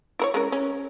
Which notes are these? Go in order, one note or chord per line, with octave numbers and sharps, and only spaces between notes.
E4 A#4 C#5
G#3 C#4 A#4
C#4